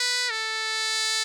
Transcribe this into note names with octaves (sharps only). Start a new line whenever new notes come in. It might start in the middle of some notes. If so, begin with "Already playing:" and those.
Already playing: B4
A4